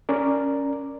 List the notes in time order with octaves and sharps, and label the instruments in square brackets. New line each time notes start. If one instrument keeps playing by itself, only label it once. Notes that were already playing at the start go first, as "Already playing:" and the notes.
[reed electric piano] C#4 A#4 D5